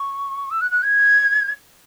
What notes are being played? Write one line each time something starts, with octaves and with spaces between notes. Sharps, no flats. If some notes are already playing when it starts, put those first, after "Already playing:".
Already playing: C#6
E6
F#6
F#6
G#6